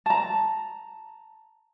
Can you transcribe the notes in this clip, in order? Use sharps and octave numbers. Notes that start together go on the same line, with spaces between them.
A5 A#5